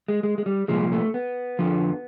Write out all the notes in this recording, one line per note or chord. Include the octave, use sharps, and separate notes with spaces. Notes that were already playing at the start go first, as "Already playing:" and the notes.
G#3
G#3
G#3
G3
C2 A#2 F3 G#3
A3
B3
F2 D3 F3